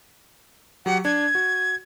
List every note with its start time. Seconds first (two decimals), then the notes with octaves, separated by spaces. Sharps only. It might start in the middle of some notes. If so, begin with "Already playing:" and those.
0.86 F#3 G4 F#5
1.05 D4 G#6
1.35 F#4